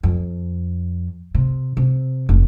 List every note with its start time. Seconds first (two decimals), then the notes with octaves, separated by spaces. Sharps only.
0.03 F2
1.35 C3
1.77 C3
2.29 F1